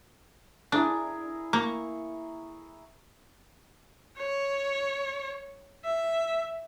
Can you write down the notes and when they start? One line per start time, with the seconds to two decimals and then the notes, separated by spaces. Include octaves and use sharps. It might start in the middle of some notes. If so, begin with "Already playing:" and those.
0.72 D4 E4 G#4 A#4
1.53 A#3 C#6
4.18 C#5
5.85 E5